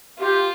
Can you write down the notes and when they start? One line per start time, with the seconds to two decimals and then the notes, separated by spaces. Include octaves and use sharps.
0.19 F4 G4